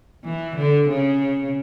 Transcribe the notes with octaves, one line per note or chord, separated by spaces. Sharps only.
E3
D3
C#3